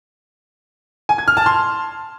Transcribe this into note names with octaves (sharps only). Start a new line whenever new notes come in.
G#5
G#6
F6
A5
C6